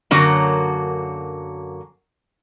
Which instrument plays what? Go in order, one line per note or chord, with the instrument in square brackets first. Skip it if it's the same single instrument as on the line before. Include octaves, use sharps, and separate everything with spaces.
[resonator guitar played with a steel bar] F#2 D3 F#3 A#3